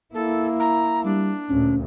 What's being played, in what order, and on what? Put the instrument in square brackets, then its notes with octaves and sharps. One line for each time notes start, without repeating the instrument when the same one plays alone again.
[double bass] A#3 E4 [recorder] A4
[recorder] A#5
[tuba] G3 [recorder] D4
[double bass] D2 A#2 [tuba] C#4